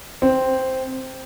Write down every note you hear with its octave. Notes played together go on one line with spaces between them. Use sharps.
C4